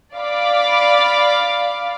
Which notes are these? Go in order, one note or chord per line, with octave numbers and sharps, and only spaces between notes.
D5 F5 B5 D6